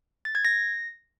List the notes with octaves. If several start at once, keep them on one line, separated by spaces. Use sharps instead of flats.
A6
G#6
A#6